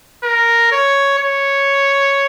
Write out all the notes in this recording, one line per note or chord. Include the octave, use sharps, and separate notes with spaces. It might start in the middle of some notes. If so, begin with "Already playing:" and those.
A#4
C#5
C#5